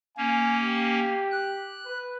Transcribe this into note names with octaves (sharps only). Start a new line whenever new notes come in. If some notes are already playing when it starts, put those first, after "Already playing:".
A#3 C#4 G#5
G4
F#6
B4